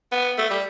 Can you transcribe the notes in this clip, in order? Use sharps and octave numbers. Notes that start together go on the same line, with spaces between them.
B3
A3
G3